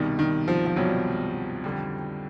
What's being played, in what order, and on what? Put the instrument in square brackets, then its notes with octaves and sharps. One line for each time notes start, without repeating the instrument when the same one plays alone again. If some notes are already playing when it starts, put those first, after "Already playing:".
Already playing: [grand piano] C2 B2 G3 [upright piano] D#3
[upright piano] D#3
F3
F3
[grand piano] C2 B2 G3 [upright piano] F#3
[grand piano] F2 D3 G3